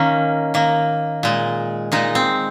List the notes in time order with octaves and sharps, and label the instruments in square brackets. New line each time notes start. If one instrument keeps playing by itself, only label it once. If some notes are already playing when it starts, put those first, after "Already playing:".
Already playing: [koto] D#3 A#3 C#4
D#3 A#3
A#2 G#3
A#2 G#3 D#4
C4